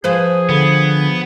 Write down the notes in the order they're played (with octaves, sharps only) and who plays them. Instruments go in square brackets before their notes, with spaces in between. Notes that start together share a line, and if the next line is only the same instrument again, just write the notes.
[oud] F3 B4 C5 [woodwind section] G#4
[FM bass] D3 [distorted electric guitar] B3